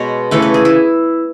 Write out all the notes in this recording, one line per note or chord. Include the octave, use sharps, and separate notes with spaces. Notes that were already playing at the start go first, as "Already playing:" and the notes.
Already playing: B2 G#3 B3 C#5
C#3 E3 A3 B4
B4
G#4
E4